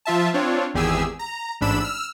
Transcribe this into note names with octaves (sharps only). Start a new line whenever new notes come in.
F3 F4 E5 A5
C4 D4 F4 C#5
G#1 E2 G4 G#4 G#5 E6
A#5
A1 G#2 D4 B5 E6 E7
E6 F6